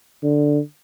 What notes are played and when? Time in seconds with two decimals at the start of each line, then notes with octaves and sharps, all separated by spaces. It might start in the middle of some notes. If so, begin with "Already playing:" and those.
0.23 D3